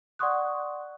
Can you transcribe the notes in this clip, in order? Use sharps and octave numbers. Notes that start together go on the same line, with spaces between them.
D5 F#5 C6 C#6 D#6 F#6